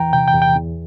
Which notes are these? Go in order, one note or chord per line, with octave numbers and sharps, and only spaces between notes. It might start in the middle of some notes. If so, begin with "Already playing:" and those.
Already playing: E2 E3 G5 A#5
C3 G5
G5
E2
G5
E2